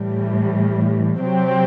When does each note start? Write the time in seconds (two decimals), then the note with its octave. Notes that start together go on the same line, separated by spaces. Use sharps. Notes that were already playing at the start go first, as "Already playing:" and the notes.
Already playing: A2 E3 G3
1.20 C3 F#3 C4 G4